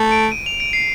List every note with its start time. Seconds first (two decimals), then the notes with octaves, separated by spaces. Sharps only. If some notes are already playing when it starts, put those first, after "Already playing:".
Already playing: A3
0.12 D7
0.32 D#7
0.46 F7
0.60 D7
0.73 C7